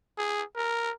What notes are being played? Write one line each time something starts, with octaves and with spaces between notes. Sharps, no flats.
G#4
A#4